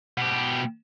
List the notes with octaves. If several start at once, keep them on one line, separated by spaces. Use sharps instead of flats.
B2 G4